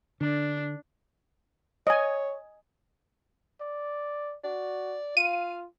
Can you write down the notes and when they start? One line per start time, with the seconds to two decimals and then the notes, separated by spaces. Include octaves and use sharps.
0.21 D3 D4
1.87 C#5 D#5 G#5
3.61 D5
4.44 F#4 D5
5.17 F4 F5 D#7